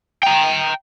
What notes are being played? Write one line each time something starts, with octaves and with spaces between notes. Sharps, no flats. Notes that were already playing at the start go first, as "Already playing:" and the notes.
G5 A#5